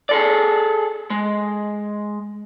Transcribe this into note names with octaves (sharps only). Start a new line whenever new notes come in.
G#4 A4 D5
G#3